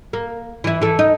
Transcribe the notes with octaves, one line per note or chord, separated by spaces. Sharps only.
A#3
E3 E4
E3 A4
D#4